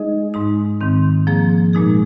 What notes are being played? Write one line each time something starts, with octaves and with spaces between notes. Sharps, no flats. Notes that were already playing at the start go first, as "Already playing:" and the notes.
Already playing: G#3 D#4 G#4 D#5
G#2 G#3 D#4
G#2 D#3 C4
F3 A#3 G#4
A#2 G#3 D#4 G#4